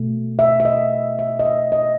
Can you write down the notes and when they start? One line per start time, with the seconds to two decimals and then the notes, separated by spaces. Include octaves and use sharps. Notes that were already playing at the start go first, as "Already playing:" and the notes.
Already playing: B2 A3
0.39 E5
0.60 E5
0.65 D#5
1.19 E5
1.39 D#5
1.45 E5
1.72 D#5